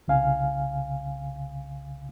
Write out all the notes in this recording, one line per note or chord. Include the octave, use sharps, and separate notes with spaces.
C2 C#3 F5 G#5